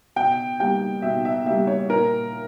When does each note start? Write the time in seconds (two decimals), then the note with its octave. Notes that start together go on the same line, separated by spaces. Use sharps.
0.16 B2 G5
0.60 G3 A#3 G5
1.02 B2 E5
1.25 E5
1.46 G3 A#3 E5
1.67 C#5
1.90 A#2 A#4